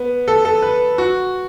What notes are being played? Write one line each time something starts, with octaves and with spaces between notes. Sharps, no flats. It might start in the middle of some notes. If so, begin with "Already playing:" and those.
Already playing: B3
A4
A4
B4
F#4